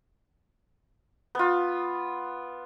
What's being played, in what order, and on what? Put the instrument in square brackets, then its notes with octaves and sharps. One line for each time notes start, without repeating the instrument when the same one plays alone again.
[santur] B3 F4